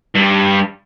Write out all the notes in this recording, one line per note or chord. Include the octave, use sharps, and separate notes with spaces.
G2 G3